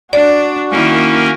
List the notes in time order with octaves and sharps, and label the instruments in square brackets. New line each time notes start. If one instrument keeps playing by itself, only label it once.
[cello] D4 [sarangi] F#4 [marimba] D5
[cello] D#3 E4 [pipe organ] A#3 C#4 A#4